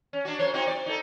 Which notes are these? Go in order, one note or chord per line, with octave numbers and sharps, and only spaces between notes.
C#4
D4 F#4
F#2 C5 C#5
C4 D#4 F#4
D5
D#4 A4